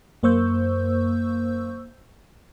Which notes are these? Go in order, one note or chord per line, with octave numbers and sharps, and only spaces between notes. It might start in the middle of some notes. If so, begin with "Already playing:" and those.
F#2 A#3 C5 C#6 E6 G6